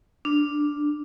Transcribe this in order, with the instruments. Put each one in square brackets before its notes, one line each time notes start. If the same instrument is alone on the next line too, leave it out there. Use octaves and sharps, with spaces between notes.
[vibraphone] D4